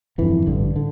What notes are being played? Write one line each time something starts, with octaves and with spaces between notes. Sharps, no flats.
G1 F2 D3 E3
A1 G2 D3
D3